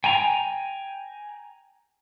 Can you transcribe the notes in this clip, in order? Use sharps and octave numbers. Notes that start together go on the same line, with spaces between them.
G5 G#5 A#5